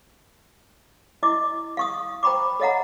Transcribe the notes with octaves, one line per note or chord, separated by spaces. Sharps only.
E4 D#5 D6
F5 C#6 D#6
C5 G5 A#5 B5 C#6 D6
A4 C#5 D#5 F5 F#5 A#5